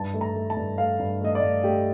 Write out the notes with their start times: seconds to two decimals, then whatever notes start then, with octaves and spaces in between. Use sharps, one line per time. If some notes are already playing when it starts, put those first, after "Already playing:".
Already playing: G2 A5
0.14 A3
0.21 A#5
0.35 A3
0.50 A5
0.57 G2
0.78 A3 F5
0.99 G2
1.21 A3 D#5
1.35 D5
1.43 G2
1.64 A3 G4